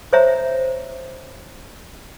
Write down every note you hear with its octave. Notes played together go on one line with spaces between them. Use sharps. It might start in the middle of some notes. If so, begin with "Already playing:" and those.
C5 C#5 E5 A#5